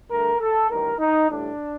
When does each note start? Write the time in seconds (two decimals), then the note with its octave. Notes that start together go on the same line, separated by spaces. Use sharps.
0.10 G2 D3 A3 A#4
0.39 A4
0.70 A1 G2 D#3 A#4
0.99 D#4
1.29 A1 A2 G3 D4